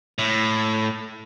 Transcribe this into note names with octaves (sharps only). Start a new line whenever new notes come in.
A2